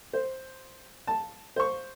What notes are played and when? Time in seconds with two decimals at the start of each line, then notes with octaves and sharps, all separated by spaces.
0.13 C5
1.07 A5
1.56 C5 C#6